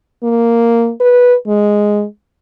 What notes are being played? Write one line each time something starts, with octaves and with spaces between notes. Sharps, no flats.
A#3
B4
G#3